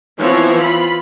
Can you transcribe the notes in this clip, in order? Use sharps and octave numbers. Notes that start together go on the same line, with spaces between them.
E3 F3 B3 C4 C#5
F4 B5